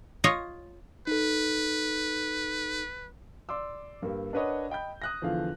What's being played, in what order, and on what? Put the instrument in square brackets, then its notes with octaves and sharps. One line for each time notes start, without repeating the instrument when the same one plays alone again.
[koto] F4 C#5 D#5
[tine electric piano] D#4 A4 [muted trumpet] B4
[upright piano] D5 C6 D6 E6
G2 A#3 G4
D4 A#4 B4 C#5 D#5 F#5
D#5 G5 B5 G6
D#6 F#6 A#6
E2 D3 F3 F5